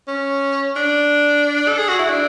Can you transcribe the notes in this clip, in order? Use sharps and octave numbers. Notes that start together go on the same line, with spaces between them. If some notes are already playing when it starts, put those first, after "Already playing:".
C#4
D4
A4
G#4
F#4
E4
D4